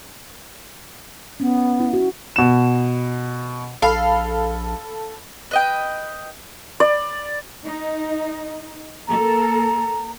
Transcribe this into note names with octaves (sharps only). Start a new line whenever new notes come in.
B3 C#4
E4
F#4
B2 E7
A#1 A4 F5 B5
B4 D#5 G5
D5
D#4
A#3 A4 A#4 A#5